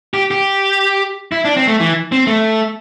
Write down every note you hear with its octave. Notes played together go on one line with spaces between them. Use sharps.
G4
G4
E4
D4
C4
A3
E3
C4
A3